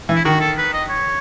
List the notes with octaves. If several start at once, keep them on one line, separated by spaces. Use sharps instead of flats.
E3
E4
D#3 F#4
A4
B4
D#5
C#5